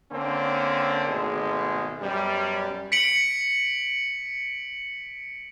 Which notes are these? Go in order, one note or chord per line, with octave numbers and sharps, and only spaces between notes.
D3 A#3 C4 C#4
G#1 B2 G#3 A3
F#2 B2 G3
B6 C#7 D7 F#7